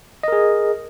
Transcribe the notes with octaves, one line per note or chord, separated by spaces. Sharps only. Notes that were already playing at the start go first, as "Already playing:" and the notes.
G#4 A#4 D#5